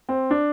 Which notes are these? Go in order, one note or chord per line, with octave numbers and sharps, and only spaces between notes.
C4
D4